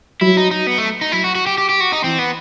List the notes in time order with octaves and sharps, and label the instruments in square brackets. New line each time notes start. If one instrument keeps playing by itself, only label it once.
[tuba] F#3 [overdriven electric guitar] E4
[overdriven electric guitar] D#4
D#4
B3
A3
D#4
[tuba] F#3 [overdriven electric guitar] E4
[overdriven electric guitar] F#4
F#4
G4
G4
G4
F#4
D#4
[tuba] E3 [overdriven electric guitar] C4
[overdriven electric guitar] B3